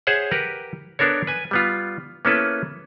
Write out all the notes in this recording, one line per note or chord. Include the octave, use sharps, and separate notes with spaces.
G#4 C5 C#5 E5 F#5
G4 A#4 B4 F#5
B3 D4 A4 A#4 C#5
B4 G#5
G3 B3 F4
A#3 B3 C#4 E4 A4 B4